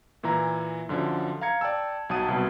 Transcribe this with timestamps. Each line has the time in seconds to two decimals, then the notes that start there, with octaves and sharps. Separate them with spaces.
0.23 A#2 E3 E4 A#5
0.89 F#2 D3 F3
1.41 F5 A#5 G#6 C#7
1.61 D5 G5 A5 E6
2.09 B1 F#3 F#5 A5 D#6 D#7
2.28 C2 B2